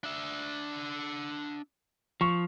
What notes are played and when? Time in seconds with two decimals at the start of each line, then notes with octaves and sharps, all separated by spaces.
0.04 D4 E5
2.21 F3 C#6